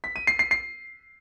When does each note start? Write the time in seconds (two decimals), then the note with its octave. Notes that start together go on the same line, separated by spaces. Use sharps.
0.04 B6
0.16 D#7
0.27 C7
0.39 C7
0.51 C7